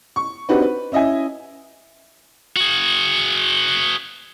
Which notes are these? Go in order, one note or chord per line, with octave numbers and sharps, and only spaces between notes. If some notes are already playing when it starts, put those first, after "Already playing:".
C#6
C4 D4 D#4 F#4 G4 B4
B4
C#4 E4 D#5 E5 G#5
F#4 G#4